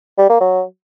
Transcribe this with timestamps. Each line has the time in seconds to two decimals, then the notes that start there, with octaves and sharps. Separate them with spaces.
0.18 G3
0.29 A#3
0.40 F#3